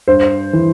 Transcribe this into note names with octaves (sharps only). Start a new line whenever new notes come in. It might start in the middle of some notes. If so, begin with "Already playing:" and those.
G2 C5
E3